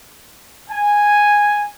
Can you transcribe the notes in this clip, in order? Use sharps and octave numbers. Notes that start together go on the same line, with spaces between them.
G#5